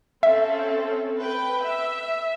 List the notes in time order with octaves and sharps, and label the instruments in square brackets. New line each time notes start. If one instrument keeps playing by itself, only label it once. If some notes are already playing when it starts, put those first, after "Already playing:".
[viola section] C4 C#4 A4 [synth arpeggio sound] E5
[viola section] B4 G5
E5